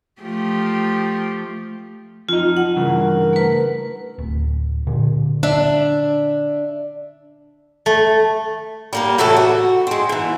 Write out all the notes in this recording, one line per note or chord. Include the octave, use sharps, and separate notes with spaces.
F3 A3 G4
F2 D#4 F4
F#5
G2 C#3 E3 A#4
A3 B4
D1
A#2 D3
D4 E5
A3
G3 A#3 G4
A2 C3 E3 F#4 A4
F#4
G#3 C4
G#2 E3